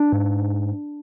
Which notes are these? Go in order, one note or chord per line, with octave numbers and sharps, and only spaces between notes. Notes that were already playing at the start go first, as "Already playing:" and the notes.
Already playing: D4
G#2